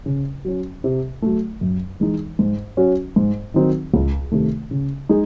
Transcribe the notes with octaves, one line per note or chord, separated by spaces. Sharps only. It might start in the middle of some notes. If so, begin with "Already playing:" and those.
C#3
F#3 C#4
C3
F#3 A3
F#2
E3 G#3 D#4
G#2
F#3 C#4 F#4
G#2
D#3 F#3 C4 D#4
C#2
C3 D#3 A3
C#3
G#3 D#4 G#4